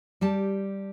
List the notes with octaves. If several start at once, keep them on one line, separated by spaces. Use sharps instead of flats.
G3 G4 A5